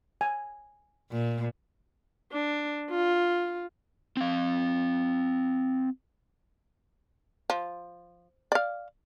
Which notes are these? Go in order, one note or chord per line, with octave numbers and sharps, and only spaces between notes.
G#5
A#2
D4
F4
C4 F5
F3
D5 F5